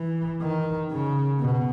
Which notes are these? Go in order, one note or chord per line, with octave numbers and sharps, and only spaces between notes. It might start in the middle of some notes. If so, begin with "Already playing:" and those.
Already playing: E3
D#3
C#3
B2